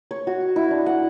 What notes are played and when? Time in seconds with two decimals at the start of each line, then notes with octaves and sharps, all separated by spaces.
0.11 C#5
0.27 F#4
0.56 E4
0.71 D4
0.86 F#5